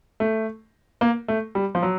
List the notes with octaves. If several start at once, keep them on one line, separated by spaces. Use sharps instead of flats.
A3
A#3
A3
G3
F3
F#3